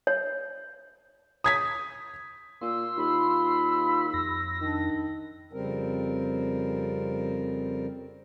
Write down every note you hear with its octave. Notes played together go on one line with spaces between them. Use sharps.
C#5
D#6 G#6 B6
A#2 F4 C6 E6
D#2 B5
F2 A#6
D#3 D4
F2 C#3 G3 C4 A#4